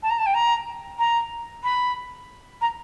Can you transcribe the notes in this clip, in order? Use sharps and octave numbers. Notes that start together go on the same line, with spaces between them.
A5
A#5
A5
G5
A#5
A#5
B5
A#5